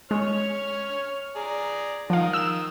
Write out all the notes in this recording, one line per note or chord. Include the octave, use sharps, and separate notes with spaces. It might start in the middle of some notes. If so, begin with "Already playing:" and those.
G#3 C#5 C#6 F6
G#4 D5 A#5
D#3 F3 F5 D#6
E6 E7